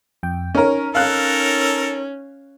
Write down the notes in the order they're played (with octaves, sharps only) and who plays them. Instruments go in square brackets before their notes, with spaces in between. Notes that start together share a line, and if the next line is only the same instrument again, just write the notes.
[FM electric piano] F2 G5
[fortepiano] C#4 A#4 [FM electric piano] D#4 C#5
[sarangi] C#4 [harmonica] A4 A#4 [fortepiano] F5 F#6